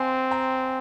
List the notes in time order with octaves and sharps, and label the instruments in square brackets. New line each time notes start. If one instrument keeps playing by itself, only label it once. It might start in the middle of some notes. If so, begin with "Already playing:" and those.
Already playing: [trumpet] C4 [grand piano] F5 G#5 C6
[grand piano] G5 A#5